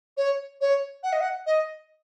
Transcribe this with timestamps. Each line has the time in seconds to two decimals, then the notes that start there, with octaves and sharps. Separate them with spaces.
0.17 C#5
0.61 C#5
1.03 F#5
1.12 D#5
1.20 F#5
1.46 D#5